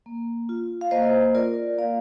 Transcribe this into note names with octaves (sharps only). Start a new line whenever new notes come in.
A#3
F4
F5
A#3 C5 D#5
F4 A#4 D5
A#3 D5 F5